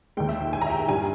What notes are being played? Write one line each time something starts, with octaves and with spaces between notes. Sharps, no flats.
D#2 D#3 G#3 G5
E5
G5
G#5
A#5
E5
G5
G5
G2 G3 G#5